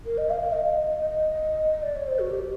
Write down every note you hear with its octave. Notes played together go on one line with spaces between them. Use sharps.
A#4
D#5
F5
F5
D#5
D#5
D#5
D#5
D#5
D5
C#5
C5
F#4
G4